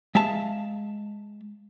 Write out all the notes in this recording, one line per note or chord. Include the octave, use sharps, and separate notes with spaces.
G#3 E5 F5 A5